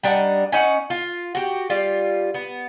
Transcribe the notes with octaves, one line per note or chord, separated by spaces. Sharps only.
G3 D4 D#4 F#5
C#4 D#4 F#5
F4
F#4 G4
G3 F4
B3